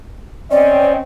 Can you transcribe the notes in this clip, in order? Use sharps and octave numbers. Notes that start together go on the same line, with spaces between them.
C4 C#4 D5 D#5